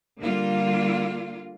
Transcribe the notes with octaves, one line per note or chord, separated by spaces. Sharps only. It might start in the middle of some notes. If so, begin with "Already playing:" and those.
D3 G3 A#3 F4